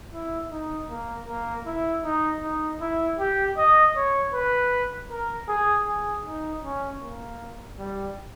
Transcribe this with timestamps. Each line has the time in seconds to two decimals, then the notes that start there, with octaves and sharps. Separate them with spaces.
0.13 E4
0.51 D#4
0.90 A#3
1.28 A#3
1.66 E4
2.04 D#4
2.42 D#4
2.81 E4
3.19 G4
3.58 D#5
3.96 C#5
4.34 B4
5.10 A#4
5.48 G#4
5.87 G#4
6.26 D#4
6.63 C#4
7.02 A#3
7.79 G3